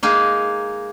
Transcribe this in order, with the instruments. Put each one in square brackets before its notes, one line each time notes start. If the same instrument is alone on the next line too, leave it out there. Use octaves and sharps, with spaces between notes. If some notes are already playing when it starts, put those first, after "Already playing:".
[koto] G#3 A#3 D#4